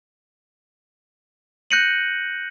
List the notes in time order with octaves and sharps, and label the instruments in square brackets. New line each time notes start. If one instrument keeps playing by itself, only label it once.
[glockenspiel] F#6 G6 A#6 C#7 D#7 F#7